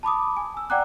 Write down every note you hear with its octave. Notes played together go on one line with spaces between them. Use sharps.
A5 B5 D6 D#6
G#5
E6
D5 F#5 G5 A#5 D6 F#6